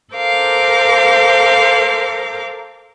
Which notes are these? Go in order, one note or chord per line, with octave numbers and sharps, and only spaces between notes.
A4 A#4 C5 F5 D6